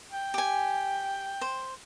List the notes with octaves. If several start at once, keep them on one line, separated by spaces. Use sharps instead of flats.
G5
G4 G#5
C5